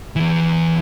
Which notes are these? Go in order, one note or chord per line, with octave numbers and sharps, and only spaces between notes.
E2 E3